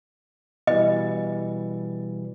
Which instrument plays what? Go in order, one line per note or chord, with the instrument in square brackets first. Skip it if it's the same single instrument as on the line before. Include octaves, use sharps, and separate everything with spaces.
[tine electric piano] B2 E3 G3 [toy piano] D#5